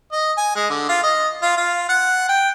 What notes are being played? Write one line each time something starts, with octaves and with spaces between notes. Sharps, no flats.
D#5
G#5
G#3
D3
F4
D#5
F4
F4
F#5
G5